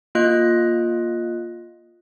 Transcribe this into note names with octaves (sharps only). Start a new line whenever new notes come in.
A#3 F4 D#5 F#6